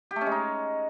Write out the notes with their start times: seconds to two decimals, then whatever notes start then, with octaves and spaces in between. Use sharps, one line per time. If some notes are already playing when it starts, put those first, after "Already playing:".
0.11 G4
0.16 A3
0.21 C#4
0.26 G#3
0.32 D#4